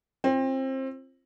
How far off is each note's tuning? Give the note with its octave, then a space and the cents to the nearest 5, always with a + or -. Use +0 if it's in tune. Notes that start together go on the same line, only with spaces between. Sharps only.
C4 +25 F4 -30